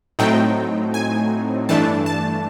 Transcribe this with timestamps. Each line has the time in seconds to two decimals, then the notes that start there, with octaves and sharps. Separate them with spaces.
0.19 A2 F#3 A3 C4 D#4 G5
0.94 G#5
1.69 G2 E3 A3 D4 A5
2.06 A5